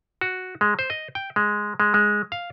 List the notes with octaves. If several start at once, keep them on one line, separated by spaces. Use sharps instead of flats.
F#4
G#3
C5
D#5
G5
G#3
G#3
G#3
F5